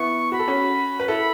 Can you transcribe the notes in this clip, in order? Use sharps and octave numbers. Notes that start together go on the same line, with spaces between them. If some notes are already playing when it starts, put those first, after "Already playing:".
Already playing: B3 E4 C#6
F#4 B5
A4
C#4 F#4
B4
E4 A4 B5